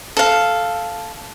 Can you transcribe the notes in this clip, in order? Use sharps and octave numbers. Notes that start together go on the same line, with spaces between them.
A4 F5